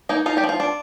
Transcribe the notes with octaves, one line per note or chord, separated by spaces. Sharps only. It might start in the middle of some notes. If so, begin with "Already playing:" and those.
A#3 D#4 A#4
D#4 F4
G3 G4
F3
F4
D4